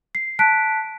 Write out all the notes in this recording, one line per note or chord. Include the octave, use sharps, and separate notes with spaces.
C7
A5 F#6 B6 D7